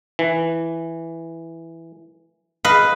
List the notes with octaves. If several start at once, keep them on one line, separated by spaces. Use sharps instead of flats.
E3
B4 D#5 F5